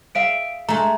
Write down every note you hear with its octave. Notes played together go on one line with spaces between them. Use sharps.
G#4 E5 F5 D7
G#3 A3 A#5